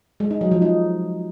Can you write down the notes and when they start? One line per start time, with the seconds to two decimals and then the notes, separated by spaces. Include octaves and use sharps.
0.20 G#3
0.31 D#4
0.41 F#3
0.51 F3
0.62 D#4